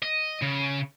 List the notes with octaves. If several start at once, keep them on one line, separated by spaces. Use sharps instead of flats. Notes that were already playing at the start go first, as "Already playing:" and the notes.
D#5
C#3